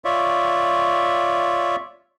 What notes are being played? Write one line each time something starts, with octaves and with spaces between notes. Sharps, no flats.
F4 C#5 D5 E5